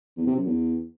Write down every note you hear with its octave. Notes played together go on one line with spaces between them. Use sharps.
E2
C3
F#2
E2